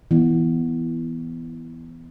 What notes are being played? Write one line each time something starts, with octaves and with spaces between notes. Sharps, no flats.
E3 B3